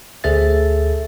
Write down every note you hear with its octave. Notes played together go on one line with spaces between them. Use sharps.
D2 G#4 A4 E5 A6